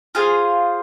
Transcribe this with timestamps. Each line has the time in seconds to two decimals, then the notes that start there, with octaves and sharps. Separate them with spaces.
0.15 F4 G#4 C5 F5